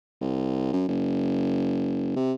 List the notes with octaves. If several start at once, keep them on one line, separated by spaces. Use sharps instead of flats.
C2
F#2
F#1
C3